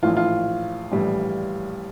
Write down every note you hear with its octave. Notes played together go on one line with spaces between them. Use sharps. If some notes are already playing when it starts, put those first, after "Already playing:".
A#1 A2 E3 F4
F4
A#1 A2 E3 G3